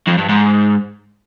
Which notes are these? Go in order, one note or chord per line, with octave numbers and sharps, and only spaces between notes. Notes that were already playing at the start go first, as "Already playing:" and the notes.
F2
G2
G#2